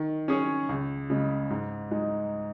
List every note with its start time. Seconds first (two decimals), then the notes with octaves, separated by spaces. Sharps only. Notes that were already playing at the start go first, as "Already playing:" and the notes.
Already playing: D#3
0.28 C#4 G#4 C#5
0.69 C#2
1.10 C#3 G#3
1.50 G#2
1.91 G#3 D#4